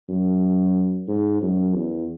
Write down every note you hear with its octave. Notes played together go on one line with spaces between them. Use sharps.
F#2
G#2
F#2
E2